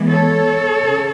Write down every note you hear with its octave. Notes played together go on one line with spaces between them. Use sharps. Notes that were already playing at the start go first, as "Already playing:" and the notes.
Already playing: E3 G#3 B3
A4 C#5
C#3